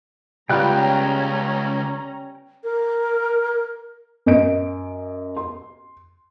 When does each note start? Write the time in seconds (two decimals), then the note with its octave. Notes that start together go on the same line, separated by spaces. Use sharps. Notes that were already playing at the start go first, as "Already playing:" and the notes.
0.49 C#2 G3 B3 C#4 F4 G5 A#5 F#6
2.64 A#4
4.26 F#2 D#5 D7
5.36 C6